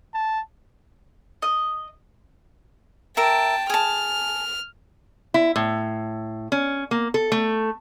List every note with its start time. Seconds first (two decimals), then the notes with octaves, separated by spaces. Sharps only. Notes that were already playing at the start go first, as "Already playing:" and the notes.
0.14 A5
1.42 D#5
3.17 A#4 E5 G5 A5
3.70 G#4 A5 F6
5.34 E4
5.56 A2
6.52 C#4
6.91 A#3
7.14 A4
7.32 A3